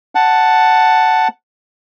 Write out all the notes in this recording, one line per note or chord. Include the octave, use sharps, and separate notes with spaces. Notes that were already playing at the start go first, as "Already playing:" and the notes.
F#5 A5